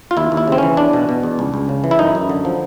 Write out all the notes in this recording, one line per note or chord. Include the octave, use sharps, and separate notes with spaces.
F4
D#2 E4
D#2
E4
C#3 C4
E3 C#4
E2 D4
B2
B2
E2
C#2
C#2
C#3
E3
E4
F#2 D#4
F#2
D3
F3